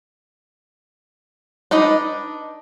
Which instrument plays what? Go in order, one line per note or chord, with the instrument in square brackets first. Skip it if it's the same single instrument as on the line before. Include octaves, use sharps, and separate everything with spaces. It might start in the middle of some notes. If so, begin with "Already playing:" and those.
[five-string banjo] D4 D#4 B4 D#5